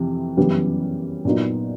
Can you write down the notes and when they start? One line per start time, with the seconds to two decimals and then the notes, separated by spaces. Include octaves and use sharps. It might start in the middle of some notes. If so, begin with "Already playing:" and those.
Already playing: F2 C3 E3
0.37 F#2 C#3 E3 G3 B3
1.25 A#2 F#3 B3 D#4 F#4